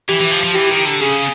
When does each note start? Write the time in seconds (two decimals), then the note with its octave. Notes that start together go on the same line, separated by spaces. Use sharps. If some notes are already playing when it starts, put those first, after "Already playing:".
0.09 E3 G4
0.21 E3
0.32 F3
0.43 F3
0.54 E3 G4
0.70 D#3
0.85 D3
1.01 C#3 G#4